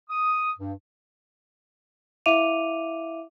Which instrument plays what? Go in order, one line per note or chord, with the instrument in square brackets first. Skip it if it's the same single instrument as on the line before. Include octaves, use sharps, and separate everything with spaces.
[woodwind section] D#6
G2
[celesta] E4 E5 F5 D6 D#7 F7